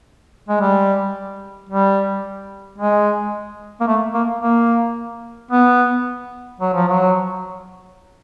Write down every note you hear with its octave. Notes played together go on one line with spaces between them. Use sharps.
G#3
G3
G3
G#3
A#3
A3
A#3
A#3
B3
F#3
F3
F#3